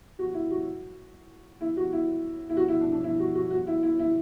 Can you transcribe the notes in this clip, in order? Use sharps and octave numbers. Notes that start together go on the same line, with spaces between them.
F#4
E4
F#4
E4
F#4
E4
E4
F#4
E4
D4
D4
E4
F#4
F#4
F#4
E4
E4
E4